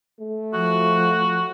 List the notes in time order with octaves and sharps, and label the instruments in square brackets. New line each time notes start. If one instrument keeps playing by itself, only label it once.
[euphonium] A3
[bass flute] F3 [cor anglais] F#4